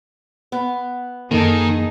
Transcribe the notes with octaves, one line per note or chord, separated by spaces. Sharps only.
B3
F#2 D#3 A#3 D#4 G#4 A4